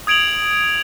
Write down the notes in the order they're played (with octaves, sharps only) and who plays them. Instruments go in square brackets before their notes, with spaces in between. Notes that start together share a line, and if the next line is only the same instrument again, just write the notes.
[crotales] D#6 G#6 D7 F7 F#7